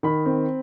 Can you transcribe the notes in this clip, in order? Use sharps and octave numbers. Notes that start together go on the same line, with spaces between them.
D#3 B5
C4